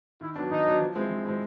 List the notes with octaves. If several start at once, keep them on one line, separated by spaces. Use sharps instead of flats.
D#3 E4
F#3 B3 D4
D#3 D#4
F#3 B3 D4
F3
G#3 C4 E4
F3
G#3 C4 E4